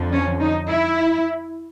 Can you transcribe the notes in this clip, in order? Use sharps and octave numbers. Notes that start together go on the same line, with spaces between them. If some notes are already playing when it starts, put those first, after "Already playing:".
Already playing: F2 D3 F3
C#4
D#4
E4